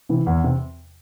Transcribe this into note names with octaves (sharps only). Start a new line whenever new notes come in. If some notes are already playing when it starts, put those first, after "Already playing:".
C3 E3
E2
C3